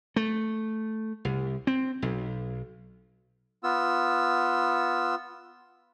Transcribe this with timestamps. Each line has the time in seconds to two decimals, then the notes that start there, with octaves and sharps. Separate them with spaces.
0.16 A3
1.25 C2
1.67 C4
2.02 B1
3.64 B3 F4 E6